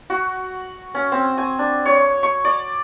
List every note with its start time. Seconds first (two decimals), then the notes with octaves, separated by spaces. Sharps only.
0.10 F#4
0.95 C#4
1.12 C4
1.38 G#5
1.59 D4
1.86 C#5
2.23 C#6
2.45 D5